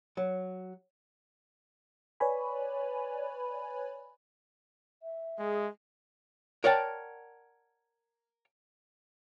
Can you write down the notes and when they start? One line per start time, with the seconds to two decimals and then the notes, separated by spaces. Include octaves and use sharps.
0.17 F#3
2.20 B4 C#5 D5 G#5 B5
5.03 E5
5.39 G#3 G#4
6.64 A#4 C#5 D5 F#5 G5 A5